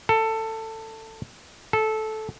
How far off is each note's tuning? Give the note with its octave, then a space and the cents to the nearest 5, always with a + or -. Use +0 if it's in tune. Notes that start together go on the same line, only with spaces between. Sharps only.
A4 +15
A4 -15